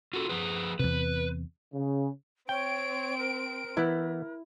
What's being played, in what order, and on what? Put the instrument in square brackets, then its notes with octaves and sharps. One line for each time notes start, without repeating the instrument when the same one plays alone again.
[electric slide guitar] F4 F#4 A4
F3 G#4 B4
[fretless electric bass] E2 C3 [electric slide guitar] B4
[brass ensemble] C#3
[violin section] C4 D7 [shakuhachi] C#5 [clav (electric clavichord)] G5
[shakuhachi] A#4
[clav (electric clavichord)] E3 B3 [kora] E4